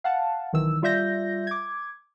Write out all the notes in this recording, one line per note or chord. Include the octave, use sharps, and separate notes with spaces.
F5 F#5 A5
B1 D#3 E3 E6
G3 F4 D5 E5 G6 A#6
D6 G#6